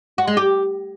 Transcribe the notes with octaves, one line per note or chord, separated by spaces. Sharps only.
F#4
G#3
G4